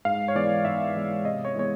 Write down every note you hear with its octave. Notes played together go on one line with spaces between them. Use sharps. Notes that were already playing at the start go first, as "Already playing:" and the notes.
G#2 F5
C#5
E3 G#3 B3 D5
G#2 E5
E3 G#3 B3
C3 D#5
C#5
E3 G#3 B3 C#5